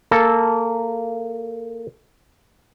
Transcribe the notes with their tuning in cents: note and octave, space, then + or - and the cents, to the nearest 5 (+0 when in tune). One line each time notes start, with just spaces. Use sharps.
A#3 -15 A4 +0